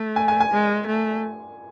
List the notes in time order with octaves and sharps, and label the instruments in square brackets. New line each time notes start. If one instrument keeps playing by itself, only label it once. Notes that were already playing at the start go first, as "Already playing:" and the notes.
Already playing: [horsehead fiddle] A3
[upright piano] G#5
G#5
G#5
[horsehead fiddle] G#3
A3